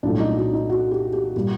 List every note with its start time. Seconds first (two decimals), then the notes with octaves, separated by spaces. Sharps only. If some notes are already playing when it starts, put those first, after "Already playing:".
0.03 C2 A#2 F#3 A3 D4
0.20 D#4
0.36 F#4
0.53 D#4
0.69 F#4
0.91 G4
1.13 G4
1.36 A#2 G3 A#3